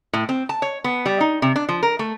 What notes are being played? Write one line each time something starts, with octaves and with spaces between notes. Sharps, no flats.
A2
C4
A5
C#5
B3
G3
D#4
C3
D4
F3
A#4
A3